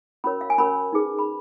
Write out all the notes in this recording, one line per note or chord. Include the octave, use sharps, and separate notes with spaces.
C#4 F#4 A#4 C#5 B5
F5
G#5
C#4 F#4 A#4 C#5 B5
D#4 G#4 B4
B5